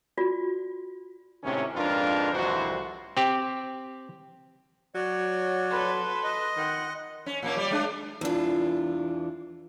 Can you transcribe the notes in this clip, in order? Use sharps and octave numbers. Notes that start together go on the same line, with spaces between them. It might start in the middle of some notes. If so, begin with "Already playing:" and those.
F4 F#4 D5
G#1 A2 C3 D#3 C#4
F2 G#2 D4 F4 A#4 B4
C2 F2 A2 E3 F#4 C5
C4 G4
F#3 C#5 D5
A4 B4 C6
D#5
D#3 F#5
C#4
A#2 A#3 C#4
G3 D5
G#3 D4
E2 E3 D4 F4